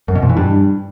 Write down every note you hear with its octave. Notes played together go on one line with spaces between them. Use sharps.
F#2
B2
F2
E3
G2